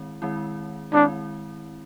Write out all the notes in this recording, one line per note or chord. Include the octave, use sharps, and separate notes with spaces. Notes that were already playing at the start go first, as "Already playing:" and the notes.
Already playing: D#3 G#3 C4 E4
D#3 G#3 C4 E4
D#3 G#3 C4 D4 E4